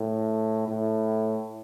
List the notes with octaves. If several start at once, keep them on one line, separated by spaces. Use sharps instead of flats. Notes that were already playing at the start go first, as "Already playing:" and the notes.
Already playing: A2
A2